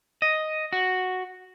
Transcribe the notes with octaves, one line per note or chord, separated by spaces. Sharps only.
D#5
F#4